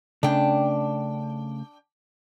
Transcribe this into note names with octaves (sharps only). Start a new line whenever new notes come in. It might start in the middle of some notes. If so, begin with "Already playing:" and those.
C#3 A3 D4 G5